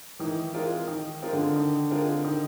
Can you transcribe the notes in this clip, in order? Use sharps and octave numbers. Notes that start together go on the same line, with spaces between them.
D#3 E3
G#3 C4 F4 A#4
D#3
G#3 C4 F4 A#4
D3
D#3
G#3 C4 F4 A#4
D#3